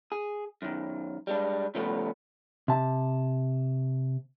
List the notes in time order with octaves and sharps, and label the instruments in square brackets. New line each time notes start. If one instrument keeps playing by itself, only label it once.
[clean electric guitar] G#4
F#2 D#3
G3 G#3 D4
C#3 F3 G3 A3 B3
C3 A5